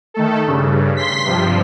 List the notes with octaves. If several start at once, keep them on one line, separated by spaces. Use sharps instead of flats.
D#3 A3 A4
G2 C#3
C6 B6
G2 C3 F3